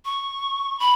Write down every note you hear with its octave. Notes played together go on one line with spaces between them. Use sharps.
C#6
B5